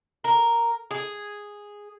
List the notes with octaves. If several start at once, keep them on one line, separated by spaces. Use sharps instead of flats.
A#4
G#4